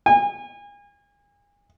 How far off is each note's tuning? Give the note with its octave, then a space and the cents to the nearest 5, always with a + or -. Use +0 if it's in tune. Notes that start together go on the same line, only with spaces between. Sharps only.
G#5 -35